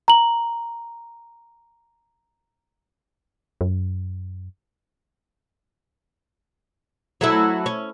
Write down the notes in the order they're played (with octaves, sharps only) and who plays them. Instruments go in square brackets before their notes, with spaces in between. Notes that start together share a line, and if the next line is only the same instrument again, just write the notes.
[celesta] A#5 F#7
[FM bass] F#2
[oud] F#3 A3 E4
C#4